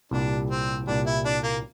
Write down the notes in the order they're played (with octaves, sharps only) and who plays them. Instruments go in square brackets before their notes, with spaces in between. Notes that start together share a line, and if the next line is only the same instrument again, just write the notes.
[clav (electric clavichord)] C2 A#2 G3 [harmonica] D4
[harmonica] C4
[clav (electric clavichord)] C2 A#2 G3 [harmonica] D4
[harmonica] E4
D4
A#3